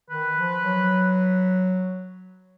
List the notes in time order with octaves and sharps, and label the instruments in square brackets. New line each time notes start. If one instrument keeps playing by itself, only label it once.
[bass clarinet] D#3 [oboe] B4
[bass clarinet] F3
F#3